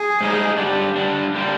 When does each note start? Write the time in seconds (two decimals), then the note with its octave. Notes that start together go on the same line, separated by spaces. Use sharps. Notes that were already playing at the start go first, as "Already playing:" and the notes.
Already playing: G#4
0.21 G#2 G3 A#3 D#4
0.58 G2 D3 G3 D4 G4
0.96 G2 D3 G3 D4
1.34 D3 G3 A#3